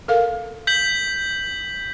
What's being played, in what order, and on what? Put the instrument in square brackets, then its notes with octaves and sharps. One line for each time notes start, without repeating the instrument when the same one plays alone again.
[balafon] A4 A#4 F5
[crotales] G6 B6 F#7